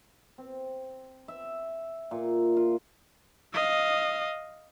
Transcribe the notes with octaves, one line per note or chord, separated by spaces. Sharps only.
C4
E5
A#2
F4
D#5 F5